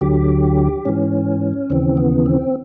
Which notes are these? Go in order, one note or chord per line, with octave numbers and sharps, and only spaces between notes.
D2 D3 F#3 G4
G#2 E3 C#4
D#2 C#3 E3 C4
B3
C4